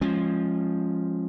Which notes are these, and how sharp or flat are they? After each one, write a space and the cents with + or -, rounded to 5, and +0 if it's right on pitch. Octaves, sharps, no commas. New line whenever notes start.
F3 +0 G#3 +0 C#4 -20